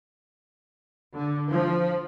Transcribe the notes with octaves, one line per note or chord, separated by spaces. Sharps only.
D3
F3